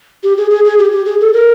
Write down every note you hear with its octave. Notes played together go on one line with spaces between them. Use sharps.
G4
G#4
G#4
G#4
G4
G4
G#4
A4
A#4